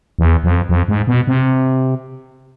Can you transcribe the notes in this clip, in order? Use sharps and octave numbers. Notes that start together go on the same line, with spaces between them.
E2
F2
F2
G#2
B2
C3